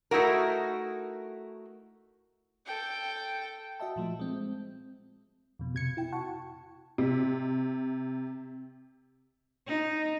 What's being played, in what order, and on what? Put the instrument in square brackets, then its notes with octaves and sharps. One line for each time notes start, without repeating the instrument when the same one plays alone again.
[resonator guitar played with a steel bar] A3 D#4 E4 F#4 A#4
[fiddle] A4 G5
[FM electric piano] F#4 D#5 E5 A5
A#2 F3 A3
G#3 C4
F2 B2
[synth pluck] C3 G#6 C#7
[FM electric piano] E4 G5
[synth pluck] F#4 [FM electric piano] A5 C#6
[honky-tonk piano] C3
[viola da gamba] D#4